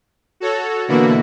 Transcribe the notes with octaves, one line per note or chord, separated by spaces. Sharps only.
F#4 A4 C#5
B2 D3 E3 A#3 E4 F#4